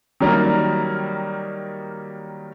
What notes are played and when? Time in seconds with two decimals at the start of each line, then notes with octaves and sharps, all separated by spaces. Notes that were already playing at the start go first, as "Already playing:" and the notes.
0.21 D#3 F#3 G3 A#3 D#4 A#4